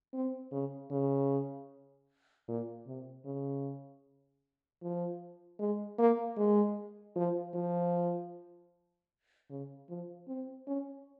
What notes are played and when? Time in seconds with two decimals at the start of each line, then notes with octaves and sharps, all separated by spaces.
0.14 C4
0.52 C#3
0.91 C#3
2.48 A#2
2.87 C3
3.25 C#3
4.82 F3
5.59 G#3
5.98 A#3
6.37 G#3
7.16 F3
7.55 F3
9.50 C#3
9.89 F3
10.28 C4
10.67 C#4